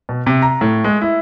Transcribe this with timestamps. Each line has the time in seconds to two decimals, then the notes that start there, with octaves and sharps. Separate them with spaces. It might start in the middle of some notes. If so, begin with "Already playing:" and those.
0.09 B2
0.26 C3
0.42 A#5
0.61 A2
0.84 G#3
1.02 E4